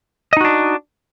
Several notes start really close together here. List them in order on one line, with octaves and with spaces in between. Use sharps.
D#5 D#4 F#4 D4